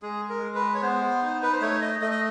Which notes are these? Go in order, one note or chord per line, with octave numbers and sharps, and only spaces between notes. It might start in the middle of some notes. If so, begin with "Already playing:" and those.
G#3 G#4
A#4
G#3
B4
C#5
B3 C5
D#4
B4
C5
A3 C#5
D#5
A3 D#5
D#5